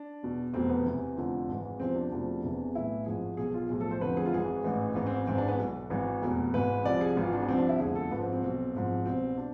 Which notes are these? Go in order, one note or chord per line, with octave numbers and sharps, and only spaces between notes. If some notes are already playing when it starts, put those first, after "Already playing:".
Already playing: D4
E2 B2
F1 E2 B2 C4
B3
E2 C3 E3
F1 F2 D3 F3
G#1 G#2 E3
E2 C3 F3 C4
D4
E1 D2 C3 F3
E1 E2 C3 E3
B1 A2 E3 E4
G#1 G#2 F3 G#4
B1 B2 G#4
F4
B1 A2 F3 G#4
A4
C5
F1 F2 D3 F3 B4
G#4
F4
G#1 G#2 E3 G#4
A1 G#2 E3
G#1 G#2 E3 B3
C4
G#1 G#2 E3 C4
D4
B3
B1 B2
G#1 G#2 E3
F1 E2 B2
G#1 G#2 E3 B4
C2 C3 F3 D5
G#4
G#1 G#2 E3 F4
D4
B3
C2 C3 F3 C4
D4
E4
F1 E2 D3 F3 G#4
A4
G#1 G#2 F3 B3
C4
C4
B1 B2
G#1 G#2 F3
C2 B2 C4
D4